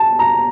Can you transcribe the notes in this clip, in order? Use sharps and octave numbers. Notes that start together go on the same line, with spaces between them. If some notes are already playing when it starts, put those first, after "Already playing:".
Already playing: A5
A#5